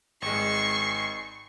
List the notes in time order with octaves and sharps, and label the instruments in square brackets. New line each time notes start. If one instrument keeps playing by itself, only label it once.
[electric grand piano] G#1 G#3 [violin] C#6 C7